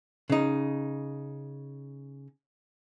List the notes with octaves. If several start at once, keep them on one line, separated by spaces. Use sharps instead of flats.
C#3 D#4